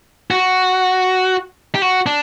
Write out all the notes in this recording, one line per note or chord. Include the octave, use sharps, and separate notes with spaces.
F#4
G4
F#4
D4